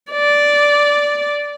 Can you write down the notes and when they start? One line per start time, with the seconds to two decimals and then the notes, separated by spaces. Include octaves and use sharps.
0.12 D5